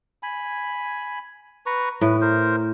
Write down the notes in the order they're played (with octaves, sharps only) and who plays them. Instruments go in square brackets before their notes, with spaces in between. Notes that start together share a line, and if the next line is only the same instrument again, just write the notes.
[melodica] G#5 B5
B4 A#5 C#6
[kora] A2 [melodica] B4
[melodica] A#4 C5